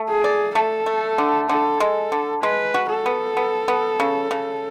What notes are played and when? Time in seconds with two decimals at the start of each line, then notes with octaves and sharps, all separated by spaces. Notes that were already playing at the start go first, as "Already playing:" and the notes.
Already playing: A3
0.09 G#4
0.24 D5
0.55 A3 A4
0.86 A3
1.18 D3
1.49 D3 A4
1.80 G#3
2.12 D3
2.43 G#3 B4
2.74 F#4
2.90 A4
3.06 B3
3.37 B3
3.68 B3
4.00 C#3
4.31 C#3